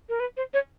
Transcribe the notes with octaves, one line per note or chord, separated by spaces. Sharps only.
A#4
B4
C5
C#5